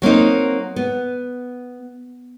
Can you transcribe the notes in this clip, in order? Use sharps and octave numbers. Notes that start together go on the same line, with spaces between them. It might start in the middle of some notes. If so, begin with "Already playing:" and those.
F#3 A#3 C4 D#4
B3